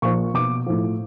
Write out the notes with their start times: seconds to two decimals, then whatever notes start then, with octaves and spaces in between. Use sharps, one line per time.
0.02 A#2 F3 C#6
0.34 B2 D6
0.66 A2 F3